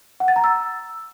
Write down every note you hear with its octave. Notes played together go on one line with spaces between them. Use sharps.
F#5
A6
A#5
E6